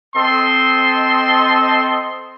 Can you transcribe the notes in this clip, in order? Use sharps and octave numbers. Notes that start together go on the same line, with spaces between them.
C4 A4 D#5 C6